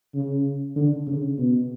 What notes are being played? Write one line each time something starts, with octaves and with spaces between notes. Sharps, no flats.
C#3
D3
C#3
B2